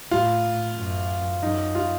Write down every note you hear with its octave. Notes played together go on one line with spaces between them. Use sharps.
A2 F4
F#2
F#2 D#4
F4